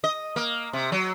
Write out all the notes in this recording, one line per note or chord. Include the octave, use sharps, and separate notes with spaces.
D#5
A#3
C3
F#3